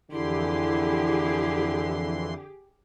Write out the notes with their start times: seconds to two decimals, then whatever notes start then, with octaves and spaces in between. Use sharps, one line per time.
0.11 F2 D3 E3 E4 G4 G#4 C6